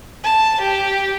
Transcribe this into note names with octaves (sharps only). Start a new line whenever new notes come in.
A5
G4